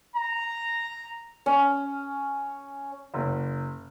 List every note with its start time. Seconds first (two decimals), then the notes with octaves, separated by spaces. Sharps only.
0.15 A#5
1.46 C#4
3.14 F#1